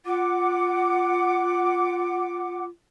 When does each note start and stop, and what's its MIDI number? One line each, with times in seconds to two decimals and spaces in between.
0.05 2.67 65
0.05 2.63 78
0.05 2.63 86